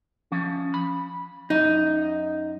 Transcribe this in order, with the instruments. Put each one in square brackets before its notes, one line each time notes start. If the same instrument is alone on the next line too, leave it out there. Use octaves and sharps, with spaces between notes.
[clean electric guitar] F3 C#4
B5
[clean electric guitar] F#2 [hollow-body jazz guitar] D#4